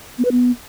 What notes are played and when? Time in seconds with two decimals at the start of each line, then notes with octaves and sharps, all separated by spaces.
0.18 B3
0.25 B4
0.31 B3